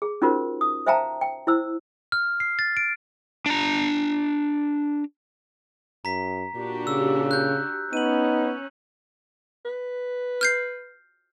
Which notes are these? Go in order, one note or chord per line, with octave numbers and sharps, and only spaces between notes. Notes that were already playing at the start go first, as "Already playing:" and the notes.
G#4
C#4 D#4 F4 F#4 A#4 C5
D#6
C5 E5 F5 G5 A5 A#5
G5
E4 C5 E6
F6
C7
A6
D7
D4 A#5
F#2 A#5 B6
A#2 D4 F#4 G4
C#3 E6
F#6 G6
B3 C#4 D#4 D#7 F#7
B4
F6 G6 C7